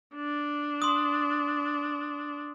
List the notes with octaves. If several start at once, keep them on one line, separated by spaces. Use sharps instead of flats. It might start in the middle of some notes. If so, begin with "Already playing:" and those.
D4
C6 D#6